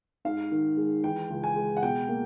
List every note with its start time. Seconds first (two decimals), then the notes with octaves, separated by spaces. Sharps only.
0.25 G#2 F5
0.52 D#3
0.77 G#3
1.04 E3 G5
1.30 C#2
1.44 G#5
1.56 G#3
1.77 F#5
1.83 B2 G5
2.09 A#3